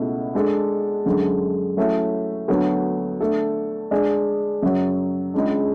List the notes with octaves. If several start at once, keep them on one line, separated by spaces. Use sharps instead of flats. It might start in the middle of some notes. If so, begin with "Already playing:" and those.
Already playing: C#2 B2 A3 E4
G#3 D4 A4
F#2 D3 G#3
F#3 A3 C#4 E4
D2 D3 F#3 B3
D3 A3 D4 A4
G#3 D4 G#4 D5
F#2 C#3 F#3
C#2 C#3 G#3 D4